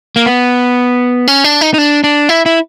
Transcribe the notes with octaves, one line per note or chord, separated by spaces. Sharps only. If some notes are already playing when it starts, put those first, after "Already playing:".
A#3
B3
C#4
D4
D#4
D#4
D4
D4
E4
E4